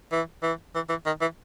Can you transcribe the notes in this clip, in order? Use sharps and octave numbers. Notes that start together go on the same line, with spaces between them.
E3
E3
E3
E3
D#3
E3